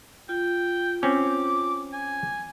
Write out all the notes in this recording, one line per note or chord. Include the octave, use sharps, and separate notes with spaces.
F4 G5
C4 C#4 D6
G#5